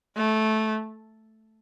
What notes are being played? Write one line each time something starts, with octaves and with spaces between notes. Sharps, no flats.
A3